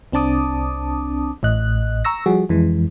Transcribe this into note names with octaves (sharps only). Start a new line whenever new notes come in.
C2 C4 D4 A5 D6 D#6
A1 A2 D#5 F#6
A#5 C#6 E6 A#6
F3 G3 F#4 G#4
F2 E3 G#3